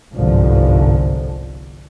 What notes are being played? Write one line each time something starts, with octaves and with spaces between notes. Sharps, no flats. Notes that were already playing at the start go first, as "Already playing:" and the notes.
G1 C2 G#2 D3 F3